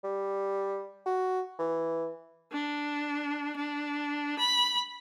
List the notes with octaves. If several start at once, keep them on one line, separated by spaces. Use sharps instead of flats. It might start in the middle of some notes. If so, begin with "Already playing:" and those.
G3
F#4
E3
D4
D4
B5